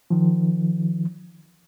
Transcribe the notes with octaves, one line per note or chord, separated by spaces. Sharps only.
D#3 F3